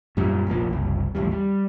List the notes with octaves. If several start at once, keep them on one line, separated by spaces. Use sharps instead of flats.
F#2 A#2 G3
F1 A#1 F3 A#3
F#1 C2
A1 D#2 G#2 G3
G3